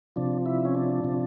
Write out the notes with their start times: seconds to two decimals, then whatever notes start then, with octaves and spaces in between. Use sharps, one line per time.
0.16 C3 F3 D4
0.46 E4
0.65 C#4
0.75 D4
1.04 C3 F3